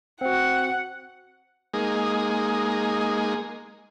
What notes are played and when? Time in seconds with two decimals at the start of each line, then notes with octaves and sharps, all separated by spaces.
0.21 C4 F#4 F#5
1.74 G#3 A#3 D#4 G#4